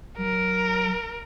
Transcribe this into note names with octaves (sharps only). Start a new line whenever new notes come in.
F#3 A#4